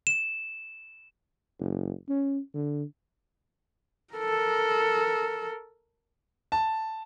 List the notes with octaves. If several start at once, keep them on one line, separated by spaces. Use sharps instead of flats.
E7
F#1
C#4
D3
A4 A#4
A5